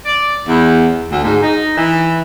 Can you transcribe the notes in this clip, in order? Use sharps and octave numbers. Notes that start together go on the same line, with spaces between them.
D5
E2
D2
G#2
D#4
E3